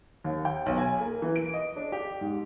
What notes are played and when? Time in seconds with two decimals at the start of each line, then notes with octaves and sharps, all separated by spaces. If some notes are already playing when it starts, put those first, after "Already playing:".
0.24 D#2
0.45 G5
0.66 B1
0.78 G#5
1.00 A#3
1.22 E3
1.36 D7
1.54 D#5
1.76 D4
1.92 G4
2.21 G#2